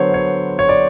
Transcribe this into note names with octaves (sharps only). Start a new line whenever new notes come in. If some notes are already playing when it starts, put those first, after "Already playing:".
Already playing: D3 F#3 B3 C5 C#5
C#5
C#5
D5